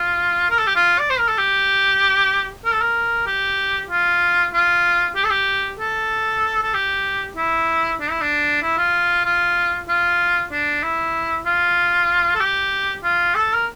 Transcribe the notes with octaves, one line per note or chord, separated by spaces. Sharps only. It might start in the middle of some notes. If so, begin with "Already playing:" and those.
Already playing: F4
A#4
A4
G4
F4
D5
C5
A#4
A4
G4
A#4
A4
A#4
G4
F4
F4
G4
A4
G4
A4
A4
G4
E4
D4
E4
D4
E4
F4
F4
F4
D4
E4
F4
A4
G4
F4
A4
A#4